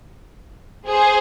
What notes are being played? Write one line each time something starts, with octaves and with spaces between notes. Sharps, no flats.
G#4 C5